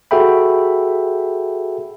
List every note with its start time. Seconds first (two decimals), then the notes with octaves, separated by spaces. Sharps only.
0.11 F#4 G#4 A4 E5 G5 B5